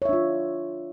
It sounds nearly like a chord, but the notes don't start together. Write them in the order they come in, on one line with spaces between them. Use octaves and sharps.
C#5 E5 D4 F4